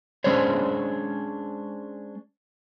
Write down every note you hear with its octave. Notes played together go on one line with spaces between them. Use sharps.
G#3 C#4 D4 C5 C#5